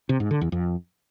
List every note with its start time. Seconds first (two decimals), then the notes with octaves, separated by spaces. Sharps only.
0.09 C3
0.20 G#2
0.31 D3
0.41 E2
0.52 F2